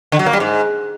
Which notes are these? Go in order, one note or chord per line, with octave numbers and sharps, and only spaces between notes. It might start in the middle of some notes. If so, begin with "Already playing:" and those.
D3
F#3
A#3
G3
G#2